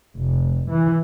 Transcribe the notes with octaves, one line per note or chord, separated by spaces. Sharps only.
F1
E3